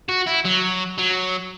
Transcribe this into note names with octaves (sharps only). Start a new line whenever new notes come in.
F#4
E4
F#3
F#3